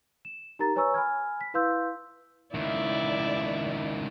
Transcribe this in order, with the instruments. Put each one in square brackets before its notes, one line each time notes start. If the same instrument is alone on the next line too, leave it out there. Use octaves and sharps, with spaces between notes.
[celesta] E7
D#4 G4 A#4 A#5 A6
B4 C#5 G#5 A#5 C#6 E6
G#5 B5 F6 G#6
B6
E4 B4 F5 C6 E6 G6
[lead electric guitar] C#2 D#3 [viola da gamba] E4 D5